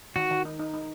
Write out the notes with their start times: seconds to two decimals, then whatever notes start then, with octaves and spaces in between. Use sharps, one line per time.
0.16 D#3 F#4
0.31 D#3
0.45 D#4
0.59 D#4
0.74 D#4